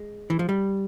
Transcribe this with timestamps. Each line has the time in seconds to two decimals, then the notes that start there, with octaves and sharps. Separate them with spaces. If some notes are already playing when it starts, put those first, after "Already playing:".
Already playing: G#3
0.30 E3
0.39 F3
0.49 G3